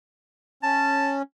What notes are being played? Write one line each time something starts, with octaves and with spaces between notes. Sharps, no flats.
C#4 A5